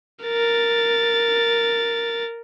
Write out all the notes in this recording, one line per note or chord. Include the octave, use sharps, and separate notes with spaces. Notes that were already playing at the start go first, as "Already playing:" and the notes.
A#4 A6